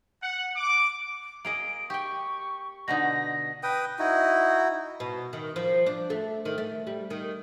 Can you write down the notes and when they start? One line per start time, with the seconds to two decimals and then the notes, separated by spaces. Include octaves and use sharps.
0.23 F#5
0.56 D6
1.45 A#3 G#4 D#5 D7
1.90 G4 G5 C#6
2.88 B2 D3 D#4 A#6
3.63 B4 G5 D#6
3.99 D#4 E4 F#4
5.00 B2
5.33 D#3
5.56 F3
5.86 D4
6.10 A3
6.45 D#3
6.58 A3
6.87 G3
7.10 D#3